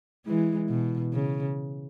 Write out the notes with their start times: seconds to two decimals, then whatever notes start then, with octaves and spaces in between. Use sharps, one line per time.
0.26 E3 G#3
0.69 B2
1.13 C#3